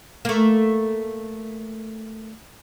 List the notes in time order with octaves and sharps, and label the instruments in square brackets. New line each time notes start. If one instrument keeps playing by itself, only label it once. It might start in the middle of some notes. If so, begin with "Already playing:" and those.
[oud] A3 A#3